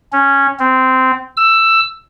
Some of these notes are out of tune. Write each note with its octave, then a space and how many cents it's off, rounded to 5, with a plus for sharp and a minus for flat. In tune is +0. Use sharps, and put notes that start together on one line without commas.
C#4 -5
C4 -15
E6 +10